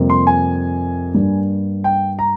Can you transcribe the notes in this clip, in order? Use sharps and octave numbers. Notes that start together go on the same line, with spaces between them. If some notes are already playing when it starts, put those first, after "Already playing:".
Already playing: F2 C3 G3 A#3
C6
G#5
G2 G3 A#3
G5
A#5